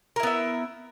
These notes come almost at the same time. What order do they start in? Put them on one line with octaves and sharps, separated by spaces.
A#4 E4 B3 E5